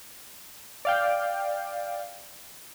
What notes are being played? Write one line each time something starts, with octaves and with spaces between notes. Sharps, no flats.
D5 F5 G5